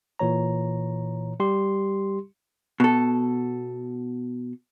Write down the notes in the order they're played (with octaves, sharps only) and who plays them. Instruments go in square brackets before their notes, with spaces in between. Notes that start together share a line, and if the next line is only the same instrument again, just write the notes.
[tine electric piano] A#2 E3 C#5 A#5
G3 G4 C6
[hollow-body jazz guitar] B2 A4